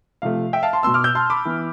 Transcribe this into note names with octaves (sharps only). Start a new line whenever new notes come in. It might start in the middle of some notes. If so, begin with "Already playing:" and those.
C3 F3 A3 F5
E5 G5
F5 A5
A5 C6
B2 B3 C6 E6
D6 F6
E6 G6
A5 C6
B5 D6
E3 B3